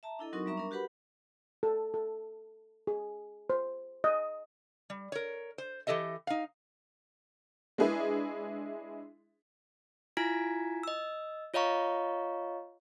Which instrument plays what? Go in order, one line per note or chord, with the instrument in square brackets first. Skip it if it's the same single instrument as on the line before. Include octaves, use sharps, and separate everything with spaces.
[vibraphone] E5 A5 A#5
D4 E4 A4 D#5
F#3 C4 D#4 F#4 A#4 C#6
G3 B3 E5 A#5 C#6
D4 A#4
F#4 G4 A#4 B4 F#5 B5
[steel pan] A4
A4
G#4
C5
D#5
[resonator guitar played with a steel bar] G3
A#4 C#5
C5
E3 G4 A4 D#5 E5
D#4 F5
[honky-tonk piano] G#3 D4 E4 G#4 B4 E5
[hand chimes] E4 F4 G#5 A#5 G#6 B6
D#5 E6
F4 C#5 D#5 F5 A#5 C#6